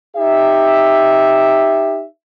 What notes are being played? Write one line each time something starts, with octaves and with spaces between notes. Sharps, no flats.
D#4 G4 E5